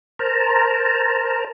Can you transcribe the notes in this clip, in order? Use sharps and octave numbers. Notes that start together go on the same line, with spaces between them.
A#4 C5 A5 A#5